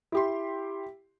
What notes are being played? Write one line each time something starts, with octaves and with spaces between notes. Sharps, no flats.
E4 G4 C6